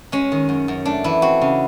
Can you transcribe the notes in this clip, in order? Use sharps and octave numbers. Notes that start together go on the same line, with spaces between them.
G#3 C#4
D#3
F#2
F#2
A3 D4
E3 E4
C4 F#4
C#3